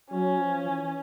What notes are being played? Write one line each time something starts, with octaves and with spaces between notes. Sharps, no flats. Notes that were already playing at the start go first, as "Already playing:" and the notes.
F#3 C#4
F3
E3